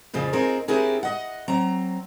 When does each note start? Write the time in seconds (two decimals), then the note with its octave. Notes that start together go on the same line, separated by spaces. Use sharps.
0.13 F2 A#2 C#3 F3
0.33 C4 D#4 F4 G#4 A#4
0.68 C4 D4 E4 G4 G#4 A#4
1.03 D#5 F#5
1.48 F#3 C4 A#5